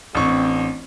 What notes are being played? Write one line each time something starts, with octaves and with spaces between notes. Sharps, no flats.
A1 C4 D4 C#6